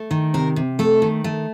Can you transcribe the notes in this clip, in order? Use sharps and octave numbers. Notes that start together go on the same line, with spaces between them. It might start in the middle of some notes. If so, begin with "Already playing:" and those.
Already playing: A3
D#3
C3 A#4
C3
A3 A4
D#3
A3